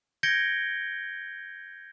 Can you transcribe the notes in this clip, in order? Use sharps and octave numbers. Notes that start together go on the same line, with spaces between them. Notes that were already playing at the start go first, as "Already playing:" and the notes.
G6 G#6 A#6 C#7 D7 G7